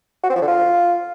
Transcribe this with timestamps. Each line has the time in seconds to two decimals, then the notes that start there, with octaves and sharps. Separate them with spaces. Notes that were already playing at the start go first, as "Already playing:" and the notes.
0.24 F#4
0.30 C4
0.36 F3
0.41 D3
0.47 F4